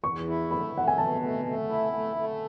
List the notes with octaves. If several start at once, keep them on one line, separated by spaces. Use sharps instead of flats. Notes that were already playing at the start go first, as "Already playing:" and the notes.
E2 C#6
E4
A3 B5
A3 F#5
G#5
B2 A5
A3
A3
E4
A3
A3